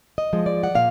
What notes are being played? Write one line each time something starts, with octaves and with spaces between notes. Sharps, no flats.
D#5
F3 G#3
D5
F#5
A#2 F5